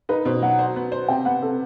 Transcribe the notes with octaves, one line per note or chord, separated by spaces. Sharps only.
D#4 B4
B2 C5
F#3 F#5
C5
B3
C5
C3 G5
B3 F#5
C3 A4